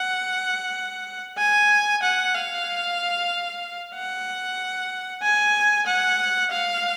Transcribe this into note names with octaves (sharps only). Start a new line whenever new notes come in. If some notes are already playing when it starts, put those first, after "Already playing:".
Already playing: F#5
G#5
F#5
F5
F#5
G#5
F#5
F5